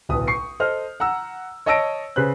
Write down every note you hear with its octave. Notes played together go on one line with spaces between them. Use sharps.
D1 B1 B4 D#6
C#6 C7 C#7
A4 C5 D#5 F6
F#5 A#5 E6
C#5 D#5 A5 E6 A#6 D7
C#3 B4 C5 F#6